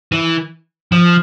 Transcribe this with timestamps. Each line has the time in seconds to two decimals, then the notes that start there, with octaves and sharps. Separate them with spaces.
0.12 E3
0.92 F3